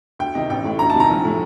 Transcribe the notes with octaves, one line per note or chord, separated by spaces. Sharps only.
D2 G5
C3 D#3 D#5
A1 G5
A2
D2 A#5
A5
C3 D#3 A#5
A#1
A2